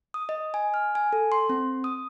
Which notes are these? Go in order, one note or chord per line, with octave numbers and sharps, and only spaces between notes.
D#6
D#5
G#5
F6
G#5
A4
C6
C4
D#6